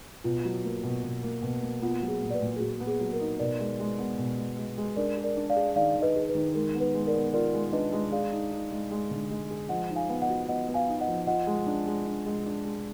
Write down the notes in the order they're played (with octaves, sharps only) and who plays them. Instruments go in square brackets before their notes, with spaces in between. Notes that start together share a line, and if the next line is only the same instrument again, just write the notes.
[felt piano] B2 [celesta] F4
[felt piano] F#3
A#3
B2
B2
A#3
B2
A#3
[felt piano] B3 [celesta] F4
[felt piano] F#3
[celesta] G#4
[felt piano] A#2
[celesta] D5
B4
[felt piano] A#2
[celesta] G#4
[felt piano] A#2 [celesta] F#4
[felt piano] B3
[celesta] G#4
[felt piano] F#3
[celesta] A#4
[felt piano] D#4
[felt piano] B2 [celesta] A#4 D5
[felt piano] G#3
G#3
B3
B2
G#3
G#3
G#3
[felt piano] D4 [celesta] A#4 D5
[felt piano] G#4
[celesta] A#4 D5
[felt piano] D4
[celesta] D5 F5
[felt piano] G#4
[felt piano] D#3 [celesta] D5 F5
[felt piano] D#3
[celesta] B4 D#5
[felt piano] G#4
[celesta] B4
[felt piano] D#3
[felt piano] G#3 [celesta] A#4
[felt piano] B3
[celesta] B4
[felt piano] G#3
[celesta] A#4 D5
[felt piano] B3
[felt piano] F4 [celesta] A#4 D5
[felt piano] G#3
[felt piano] D4 [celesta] B4 D#5
[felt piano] G#3
[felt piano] G#4 [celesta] D5 F5
[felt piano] D#4
D#4
G#3
G#3
D3
G#3
G#4
[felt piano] F3 [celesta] D#5 F#5
[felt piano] D#4
[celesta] F5 G#5
[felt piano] B3
[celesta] D#5 F#5
[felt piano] F#4
[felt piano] B3 [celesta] D#5 F#5
[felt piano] B3
[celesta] F5 G#5
[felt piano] D#4
[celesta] D#5 F#5
[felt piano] F3
[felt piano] F4 [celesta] D#5 F#5
[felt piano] G#3
D4
G#3
D4
G#3
D4
G#3